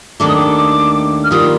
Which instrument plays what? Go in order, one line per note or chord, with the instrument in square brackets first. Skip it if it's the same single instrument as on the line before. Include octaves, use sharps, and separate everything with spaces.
[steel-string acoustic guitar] D#2 D#3 A3 D4 A4 [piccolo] D6
[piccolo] D#6
D6
F6
[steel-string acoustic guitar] D#3 G3 A#3 F4 [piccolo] D#6